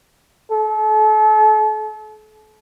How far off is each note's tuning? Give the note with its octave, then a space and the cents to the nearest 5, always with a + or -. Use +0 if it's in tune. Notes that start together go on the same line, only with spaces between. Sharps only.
A4 -40